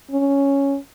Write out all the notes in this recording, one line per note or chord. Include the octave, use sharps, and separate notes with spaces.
C#4